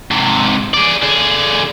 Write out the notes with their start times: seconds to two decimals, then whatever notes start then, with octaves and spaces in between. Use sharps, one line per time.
0.11 G#2 C3
0.74 G#4 D5
1.02 D3 G#4